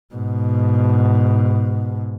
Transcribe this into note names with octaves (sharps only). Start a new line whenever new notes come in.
G#2 B2